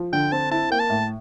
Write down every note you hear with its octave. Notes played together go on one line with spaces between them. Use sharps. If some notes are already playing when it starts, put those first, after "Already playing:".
Already playing: F3
D3 G5
C4 A5
E4 A5
A#3 G5
A5
A2